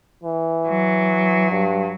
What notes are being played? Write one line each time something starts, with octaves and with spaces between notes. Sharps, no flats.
E3
F#3
G2